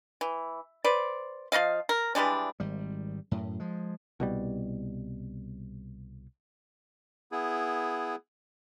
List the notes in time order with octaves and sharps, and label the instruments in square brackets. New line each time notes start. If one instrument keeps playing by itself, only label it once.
[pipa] E3
B4 C5 D5
F3 D#4 D#5 F5
A#4
E3 G3 G#3 D4
[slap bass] G#1 G3
F#2 A2
F3 G#3
[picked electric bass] C2 B2 G3
[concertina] B3 E4 G#4